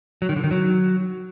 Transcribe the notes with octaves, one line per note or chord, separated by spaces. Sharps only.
F#3
D#3
D3
D#3
F#3